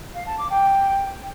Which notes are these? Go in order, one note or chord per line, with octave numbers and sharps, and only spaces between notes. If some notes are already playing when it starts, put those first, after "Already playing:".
F5
A5
D6
G5